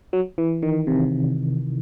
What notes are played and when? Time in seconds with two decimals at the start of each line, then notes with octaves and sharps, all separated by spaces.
0.13 F#3
0.38 E3
0.63 D#3
0.87 C3